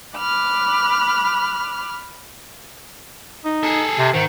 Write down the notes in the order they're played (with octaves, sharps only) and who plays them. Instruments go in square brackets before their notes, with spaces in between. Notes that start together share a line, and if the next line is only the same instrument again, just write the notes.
[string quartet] B5 D6 F6 F#6
[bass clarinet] D#4
[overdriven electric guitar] G#4 A4
[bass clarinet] C3
[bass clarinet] G#2 [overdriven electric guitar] D#3